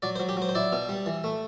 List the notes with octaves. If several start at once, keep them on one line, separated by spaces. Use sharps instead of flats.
F#3 D5
C5
F#3
G4
F#3 C5
C5
E4 D5
B2
G3
E3
A3